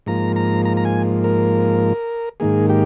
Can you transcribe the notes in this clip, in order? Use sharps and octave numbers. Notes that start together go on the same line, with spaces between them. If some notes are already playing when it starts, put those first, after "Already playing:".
G#2 F3 A#3 A#5
A#5
A#5
A#5
G#5
A#4
G#2 D#3 A#3 G#4
G4